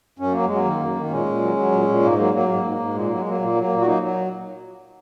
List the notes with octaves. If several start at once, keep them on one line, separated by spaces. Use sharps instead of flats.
F#2 C#4
F#3 A#3
F#3 G#3
A#3
D#3
F#2
D#3
A#3
A#2 G#3 C#4
A#2
F#3
F#3
A#2
A#2
G#2 A#3
F#3 A#3
F#3 A#3
G#2 A#3
G#2
G#2
A#2 G#3
F#3 A#3
G#3
F#3 A#3
A#2 A#3
F#3
A#3
A#2
F#4
F#3 A#3 D#4
F#3